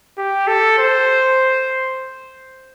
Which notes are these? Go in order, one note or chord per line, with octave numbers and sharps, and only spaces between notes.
G4
A4
C5